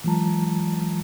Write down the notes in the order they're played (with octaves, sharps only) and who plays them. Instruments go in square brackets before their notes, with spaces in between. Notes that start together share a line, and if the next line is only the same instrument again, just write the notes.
[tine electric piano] E3 F#3 G#3 F4 A5 A#5